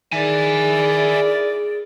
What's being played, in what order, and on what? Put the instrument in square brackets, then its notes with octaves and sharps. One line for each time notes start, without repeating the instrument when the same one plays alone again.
[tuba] D#3 [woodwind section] E4 A#4 D5 [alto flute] G#4 [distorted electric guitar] E5 G#5